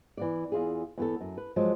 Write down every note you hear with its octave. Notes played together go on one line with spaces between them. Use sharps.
E3 B3 D5
E2 F4 G#4
E2 B3 A4
F#2
B4
F3 F#3 G#3